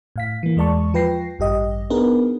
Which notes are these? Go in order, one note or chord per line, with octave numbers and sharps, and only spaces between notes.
A2 F5 B6
E3 A#3
E2 G#3 D5 A5 C#6
F3 F4 B4 G5 A#6 C7
A1 G2 G4 D#5
B3 D4 D#4 G#4 A#4 B4